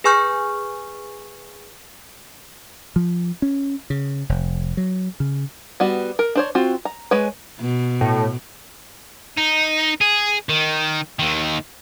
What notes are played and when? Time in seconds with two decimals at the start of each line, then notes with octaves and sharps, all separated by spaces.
0.04 G#4 B4 G#5 C#6 F6 G6
2.96 F3
3.42 C#4
3.90 C#3
4.29 F1
4.77 F#3
5.20 C#3
5.80 G3 B3 F#4
6.19 A#4
6.35 D4 C5 C#5
6.55 C4 F4 F#4
6.85 A#5
7.11 G#3 B4 C#5
7.60 B2
8.01 A2
9.38 D#4
10.01 G#4
10.49 D#3
11.19 D#2 D#3